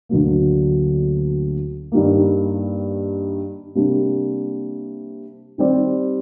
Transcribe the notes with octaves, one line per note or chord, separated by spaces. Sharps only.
D2 D3 F#3 A#3
G2 D#3 G3 A#3
C3 G3 A#3 D4
D#3 G3 C4 G4 D5